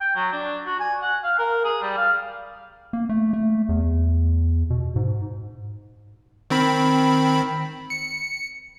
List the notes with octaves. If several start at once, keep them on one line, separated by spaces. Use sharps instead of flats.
G5
F#3
D4
F#4
G#5
F#5
F5
A#4
G#4
G3
F5
A#3
A3
A3
E2
B2
G#2
D#3 C4 B5
C#7